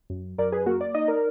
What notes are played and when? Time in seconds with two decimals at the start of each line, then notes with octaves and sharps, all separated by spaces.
0.10 F#2
0.38 F#2 A#4 D5
0.52 G#4 B4
0.66 A#3 F#4 A#4
0.81 D5
0.95 D#4 D#5
1.07 A#4 D5